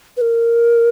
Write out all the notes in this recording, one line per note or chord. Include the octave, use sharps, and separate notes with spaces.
B4
A#4